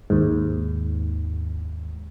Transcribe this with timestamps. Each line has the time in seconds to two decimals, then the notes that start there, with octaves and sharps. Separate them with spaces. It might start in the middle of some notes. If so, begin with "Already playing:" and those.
0.10 D#2 G#2